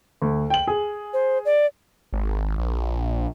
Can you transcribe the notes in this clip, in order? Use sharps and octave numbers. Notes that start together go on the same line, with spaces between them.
D2
G5 F#7
G#4
C5
D5
G#1
A#1